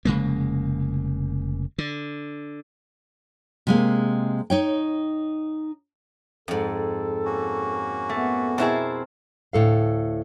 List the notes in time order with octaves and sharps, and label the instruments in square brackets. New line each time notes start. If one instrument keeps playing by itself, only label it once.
[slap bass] F1 C#3 G#3 A#3
D3
[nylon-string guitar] C3 G#3 A#3
D#4 C#5 G5
[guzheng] F2 G#2 [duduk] A4
[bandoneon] A#3 C#4 F#4
[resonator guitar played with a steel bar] A3 [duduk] B3
[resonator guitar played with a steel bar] B2 E4 G#4 [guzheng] C4 A#4 A5
[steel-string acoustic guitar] D2 A2 A4 F5